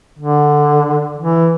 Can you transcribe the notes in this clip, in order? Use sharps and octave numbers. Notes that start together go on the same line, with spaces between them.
D3
E3